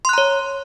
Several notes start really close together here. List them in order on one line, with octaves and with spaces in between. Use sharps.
C6 F#6 A#5 C#5